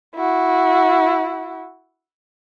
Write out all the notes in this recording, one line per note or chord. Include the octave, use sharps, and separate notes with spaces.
E4 F#4